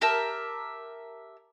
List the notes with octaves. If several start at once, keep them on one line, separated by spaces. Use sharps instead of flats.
G4 A#4 E5 A5